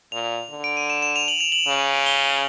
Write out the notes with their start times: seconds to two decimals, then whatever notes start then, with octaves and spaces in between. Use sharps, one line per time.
0.12 A#2 F7
0.51 D3
0.64 D7
0.77 D#7
0.90 E7
1.02 E7
1.16 F7
1.28 F#7
1.40 F7
1.52 F#7
1.67 C#3
2.06 G7